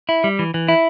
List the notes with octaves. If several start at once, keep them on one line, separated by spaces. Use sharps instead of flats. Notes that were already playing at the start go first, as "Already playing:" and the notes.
E4
G3
E3
E3
E4